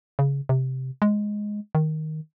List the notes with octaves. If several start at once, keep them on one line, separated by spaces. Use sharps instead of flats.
C#3
C3
G#3
D#3